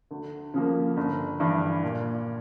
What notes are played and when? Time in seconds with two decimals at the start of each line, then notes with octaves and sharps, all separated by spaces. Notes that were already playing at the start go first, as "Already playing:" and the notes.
0.11 D2
0.54 C#3 F3 A#3
0.97 G1
1.40 G2 E3
1.83 A#2